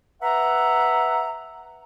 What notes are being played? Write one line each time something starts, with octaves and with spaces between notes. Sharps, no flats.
B4 E5 F#5 A#5